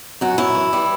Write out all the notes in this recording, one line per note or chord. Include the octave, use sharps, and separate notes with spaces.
F#2 F#4
F#2 E4
E3
G3